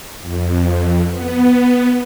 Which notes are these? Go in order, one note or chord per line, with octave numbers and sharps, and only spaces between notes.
F2
B3